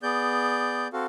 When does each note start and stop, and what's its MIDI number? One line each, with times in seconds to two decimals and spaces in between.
0.03 0.88 59
0.03 0.88 68
0.03 0.88 74
0.03 0.88 91
0.93 1.06 60
0.93 1.06 66
0.93 1.06 69
0.93 1.06 77